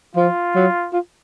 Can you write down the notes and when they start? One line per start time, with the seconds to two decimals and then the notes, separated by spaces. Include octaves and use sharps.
0.15 F3 F4
0.55 F#3
0.93 F4